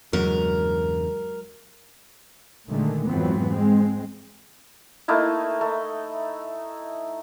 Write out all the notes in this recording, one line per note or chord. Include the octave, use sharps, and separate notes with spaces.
E2 G2 C#3 F#3 G#3 A#4
A#2 D3 D#3 G#3 A3
F2 G#2 E3 F#3 B3 C4
G#3 C4
A3 A#3 D#4 E4
A3